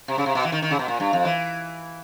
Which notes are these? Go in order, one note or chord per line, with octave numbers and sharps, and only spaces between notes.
C3
C#3
C3
B2
E3
D#3
D#3
C#3
B2
A#2
G2
F2
E3